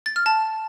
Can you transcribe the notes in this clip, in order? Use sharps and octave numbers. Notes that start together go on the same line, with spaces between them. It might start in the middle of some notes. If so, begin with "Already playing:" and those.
A6
F6
A5